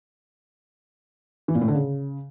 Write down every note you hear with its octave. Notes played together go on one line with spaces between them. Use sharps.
E3
A#2
A2
D3
C#3